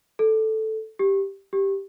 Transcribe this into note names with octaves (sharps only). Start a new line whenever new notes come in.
A4
G4
G4